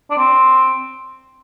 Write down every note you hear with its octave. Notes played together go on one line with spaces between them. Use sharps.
D4
C4